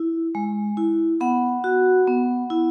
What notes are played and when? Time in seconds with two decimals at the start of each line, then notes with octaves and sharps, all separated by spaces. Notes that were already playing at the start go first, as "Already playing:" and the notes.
Already playing: E4
0.35 G#3
0.77 E4
1.21 B3 F#5 B5
1.64 F#4
2.07 B3
2.50 E4